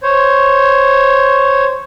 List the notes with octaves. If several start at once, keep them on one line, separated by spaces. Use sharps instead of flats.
C5 C#5